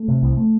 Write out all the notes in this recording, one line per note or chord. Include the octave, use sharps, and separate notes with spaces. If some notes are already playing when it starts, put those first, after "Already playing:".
Already playing: A3
C3
C2
A3